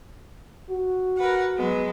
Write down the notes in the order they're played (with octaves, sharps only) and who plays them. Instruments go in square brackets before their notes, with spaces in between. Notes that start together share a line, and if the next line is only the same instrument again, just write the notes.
[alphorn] F#4
[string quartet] A#4 B4 F#5
F#3 G#3 B3